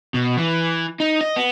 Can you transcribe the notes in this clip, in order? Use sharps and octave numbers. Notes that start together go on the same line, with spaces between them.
B2
E3
D#4
D#5
B3